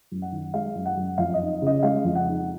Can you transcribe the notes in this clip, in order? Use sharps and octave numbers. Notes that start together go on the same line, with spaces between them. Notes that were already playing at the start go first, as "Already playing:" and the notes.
F#2
F#5
D#3
G#3 F5
F#2
F#5
F#2
F2 F5
D#5
D#4
C#3 D#5
G#3 F5
F2
F#5
D#4